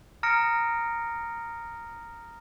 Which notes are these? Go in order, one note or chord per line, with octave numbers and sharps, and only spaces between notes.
A#5 D#6 F6 A#6 C#7 D7